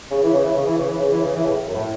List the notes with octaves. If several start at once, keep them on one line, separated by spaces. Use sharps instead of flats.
C#3
E3
C#3
E3
C#3
E3
C#3
E3
C#3
E3
C#3
E3
A2 C#3
F#2
A2